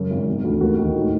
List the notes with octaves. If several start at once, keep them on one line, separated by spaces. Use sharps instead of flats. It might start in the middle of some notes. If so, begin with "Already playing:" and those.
Already playing: F#2 C#3
G#1
E1
D2
D#2 F#4
D#3
A2